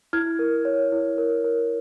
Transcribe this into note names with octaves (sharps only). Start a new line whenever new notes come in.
E4 F6 G#6
A#4
C#5
E4
A#4
A#4